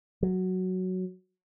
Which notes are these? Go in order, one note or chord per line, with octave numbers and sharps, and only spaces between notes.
F#3